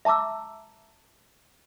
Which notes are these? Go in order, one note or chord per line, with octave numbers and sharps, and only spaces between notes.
E5 A5 A#5 D6 E6